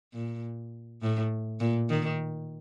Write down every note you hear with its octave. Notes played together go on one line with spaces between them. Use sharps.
A#2
A2
A#2
D#3